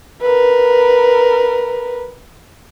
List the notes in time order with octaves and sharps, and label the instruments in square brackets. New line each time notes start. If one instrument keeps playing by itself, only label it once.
[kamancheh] A#4 B4